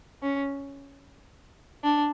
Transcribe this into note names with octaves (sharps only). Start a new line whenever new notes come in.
C#4
D4